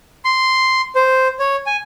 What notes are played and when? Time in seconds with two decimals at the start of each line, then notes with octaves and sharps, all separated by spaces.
0.25 C6
0.95 C5
1.39 C#5
1.66 G#5